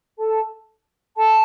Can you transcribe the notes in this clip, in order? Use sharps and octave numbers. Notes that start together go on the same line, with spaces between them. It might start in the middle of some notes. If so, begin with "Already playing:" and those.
A4 A5
A4 A5